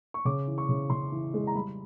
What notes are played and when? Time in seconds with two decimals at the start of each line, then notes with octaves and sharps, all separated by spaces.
0.14 C#6
0.25 C#3 D6
0.47 E3
0.58 C#6
0.69 C#3
0.90 C#3 C6
1.12 E3
1.34 G#3
1.47 A#5
1.55 G3 B5